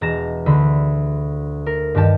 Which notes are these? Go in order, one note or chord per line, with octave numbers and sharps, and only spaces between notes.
E1 A#5 A6 A#6 E7
D2 D3 B5
A#4
G2 D#3 G4 A5